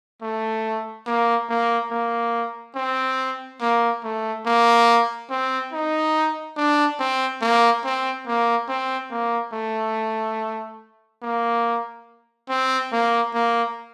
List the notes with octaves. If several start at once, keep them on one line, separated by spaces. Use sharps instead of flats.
A3
A#3
A#3
A#3
C4
A#3
A3
A#3
C4
D#4
D4
C4
A#3
C4
A#3
C4
A#3
A3
A#3
C4
A#3
A#3